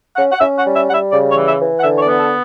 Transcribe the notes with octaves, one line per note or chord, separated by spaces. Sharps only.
C#4 F#5
F#5
C#4 E5
F#5
G3
E5
G3 F#5
E5
C#3 D5
C#5
E3
E5
E3
F#5
D3 E5
C#5
D5
B3
A4